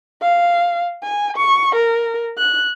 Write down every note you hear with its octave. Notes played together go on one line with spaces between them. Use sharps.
F5
G#5
C#6
A#4
F#6